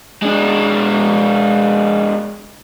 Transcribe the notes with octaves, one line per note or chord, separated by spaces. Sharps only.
G#3 D4